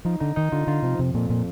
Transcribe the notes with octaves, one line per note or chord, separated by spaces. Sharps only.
F3 D#4
D3 D#4
D#3 D#4
D3 F4
D3 F4
C3 F3
F2 C3
F2 A#2
A#2